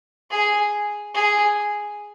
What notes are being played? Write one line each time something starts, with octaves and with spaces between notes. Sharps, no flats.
G#4
G#4